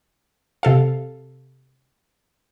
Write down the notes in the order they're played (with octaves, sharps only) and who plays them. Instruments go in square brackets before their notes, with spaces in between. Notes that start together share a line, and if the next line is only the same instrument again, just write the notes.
[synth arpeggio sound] C3 A4 F5